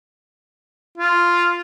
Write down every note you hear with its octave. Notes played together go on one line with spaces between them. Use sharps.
F4